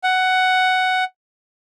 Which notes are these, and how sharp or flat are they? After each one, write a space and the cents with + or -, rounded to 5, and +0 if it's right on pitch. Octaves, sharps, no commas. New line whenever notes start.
F#5 +10